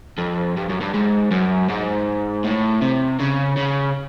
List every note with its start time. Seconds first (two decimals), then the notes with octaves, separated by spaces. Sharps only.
0.18 F2
0.57 G2
0.69 F#2
0.81 G2
0.94 G#2
1.31 F#2
1.70 G#2
2.44 A2
2.82 C3
3.20 C#3
3.57 C#3